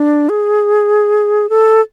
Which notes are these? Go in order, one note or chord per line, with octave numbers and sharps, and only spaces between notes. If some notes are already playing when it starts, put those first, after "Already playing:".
Already playing: D4
G#4
A4